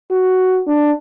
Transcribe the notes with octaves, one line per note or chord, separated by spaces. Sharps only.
F#4
D4